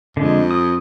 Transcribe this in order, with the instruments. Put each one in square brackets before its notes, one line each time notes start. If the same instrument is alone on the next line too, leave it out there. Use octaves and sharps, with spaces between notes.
[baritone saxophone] F2 [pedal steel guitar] D3 G#3
[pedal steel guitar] D#6